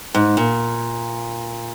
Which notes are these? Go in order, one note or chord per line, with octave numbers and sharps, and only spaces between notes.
G#2
A#2